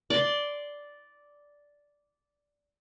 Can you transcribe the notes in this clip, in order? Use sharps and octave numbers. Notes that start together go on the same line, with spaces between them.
D5 C6